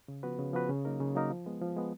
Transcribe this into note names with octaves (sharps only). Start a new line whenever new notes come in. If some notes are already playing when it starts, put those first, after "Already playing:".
C#3
F3 B3 F#4 B4
C#3
F3 B3 F#4 B4
C#3
F#3 A#3 D#4 A#4
C#3
F#3 A#3 D#4 A#4
F3
G#3 B3
F3
G#3 B3